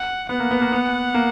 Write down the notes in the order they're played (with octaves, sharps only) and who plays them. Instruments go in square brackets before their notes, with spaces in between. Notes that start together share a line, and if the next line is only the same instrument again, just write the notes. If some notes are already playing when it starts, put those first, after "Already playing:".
Already playing: [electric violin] F#5
[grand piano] B3 [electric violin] F#5
[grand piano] A#3
B3
A#3
B3
A#3